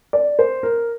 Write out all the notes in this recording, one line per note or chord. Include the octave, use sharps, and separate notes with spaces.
D5
C5
A#4